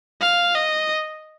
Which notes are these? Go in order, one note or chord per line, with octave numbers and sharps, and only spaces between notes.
F5
D#5